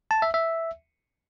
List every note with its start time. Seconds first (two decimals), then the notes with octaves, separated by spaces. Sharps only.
0.11 A5
0.22 E5
0.34 E5